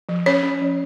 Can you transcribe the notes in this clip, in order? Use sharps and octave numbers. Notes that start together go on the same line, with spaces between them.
F3
C#4 C#5
C#4
F3